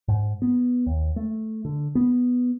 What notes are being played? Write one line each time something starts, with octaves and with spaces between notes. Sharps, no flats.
G#2
B3
D#2
A3
D3
B3